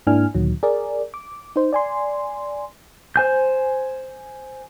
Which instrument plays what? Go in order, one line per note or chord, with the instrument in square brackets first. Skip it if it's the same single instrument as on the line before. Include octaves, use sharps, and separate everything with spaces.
[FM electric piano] G#2 A#3 D4 E4 G#5 F6
D2 A#2 D#3 F#3
G#4 A#4 D5
D6
D#4 C5
D5 G#5 C6
[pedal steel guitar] C5 G#5 G6